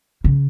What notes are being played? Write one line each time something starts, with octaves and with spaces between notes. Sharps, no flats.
C#3